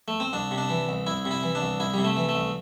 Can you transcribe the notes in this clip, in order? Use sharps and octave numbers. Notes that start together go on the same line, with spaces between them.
A3
C4
C2 D4
C3
D4
E3
C2
C2 E4
C3
E4
E3
D4
C2
C2 E4
C3 G3
A3
E3
A3
C2